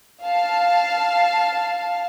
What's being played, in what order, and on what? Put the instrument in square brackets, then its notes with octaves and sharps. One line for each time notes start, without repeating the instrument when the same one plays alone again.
[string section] F5 A5